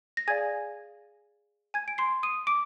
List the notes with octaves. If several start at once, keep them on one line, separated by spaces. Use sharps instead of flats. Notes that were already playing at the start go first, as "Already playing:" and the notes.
A#6
G#4 D5 F5 G#5 G#6
G#5 G#6
D7
C6 C7
D#6 D#7
D6 D7